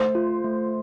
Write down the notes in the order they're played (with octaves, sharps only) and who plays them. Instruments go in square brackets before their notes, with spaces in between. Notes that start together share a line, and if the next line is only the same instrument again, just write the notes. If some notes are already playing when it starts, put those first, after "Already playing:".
Already playing: [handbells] A3 [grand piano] C5
[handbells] F4
A3